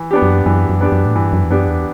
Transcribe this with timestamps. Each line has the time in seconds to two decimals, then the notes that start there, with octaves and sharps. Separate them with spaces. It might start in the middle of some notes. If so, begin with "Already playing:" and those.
Already playing: E3
0.11 B3 D4 G4
0.22 F#2
0.46 F#2 E3
0.70 F#2
0.81 B3 D4 G4
0.92 F#2
1.06 A2
1.15 G2 E3
1.33 F#2
1.43 E2
1.50 F#2 B3 D4 G4
1.67 E2